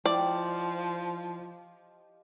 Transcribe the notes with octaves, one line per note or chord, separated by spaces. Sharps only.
F3 E4 G4 C5 D5 D#5 F5